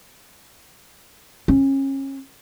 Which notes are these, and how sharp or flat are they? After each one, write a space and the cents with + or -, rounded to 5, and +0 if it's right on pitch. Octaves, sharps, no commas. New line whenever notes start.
C#4 -30